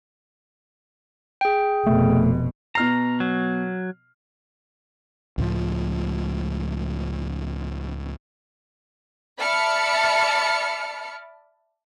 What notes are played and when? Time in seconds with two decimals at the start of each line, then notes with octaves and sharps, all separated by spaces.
1.41 G#4 G5
1.87 F1 B2 A3
2.75 B2 A#5 F6 C7
3.20 F#3
5.38 C#2 A2 F3
9.39 D5 E5 A5 B5 F6 C#7